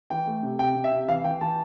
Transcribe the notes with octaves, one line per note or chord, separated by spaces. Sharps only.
E3 G5
A3
C3
C3 G5
C3
E5
C3
E3 F5
E3 G5
E3 A5